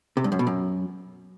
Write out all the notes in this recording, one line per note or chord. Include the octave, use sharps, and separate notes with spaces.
C3
G2
F#2
B2
F#2